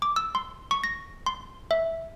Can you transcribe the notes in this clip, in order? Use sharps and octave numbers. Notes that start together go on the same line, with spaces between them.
D6
E6
C6
C#6
A#6
C6
E5